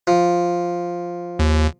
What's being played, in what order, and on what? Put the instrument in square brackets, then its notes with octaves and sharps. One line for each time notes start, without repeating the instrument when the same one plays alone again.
[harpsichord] F3
[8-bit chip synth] D#2